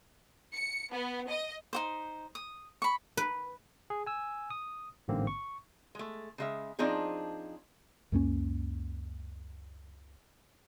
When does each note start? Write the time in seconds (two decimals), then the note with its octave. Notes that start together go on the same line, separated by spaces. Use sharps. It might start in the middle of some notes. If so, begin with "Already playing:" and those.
0.53 C#7
0.91 B3
1.28 D#5
1.73 D#4 F#4 C5
2.35 D#6
2.82 B5 C#6
3.17 B4
3.90 G#4
4.06 G#5 E6
4.50 D#6
5.08 A1 G#2 D3 A#3 C4
5.27 C#6
5.95 G#3 A3
6.38 C#3 G#3 E5
6.79 F3 C4 D4 D#4 G#4
8.12 C#2 F#2 A#3 C#4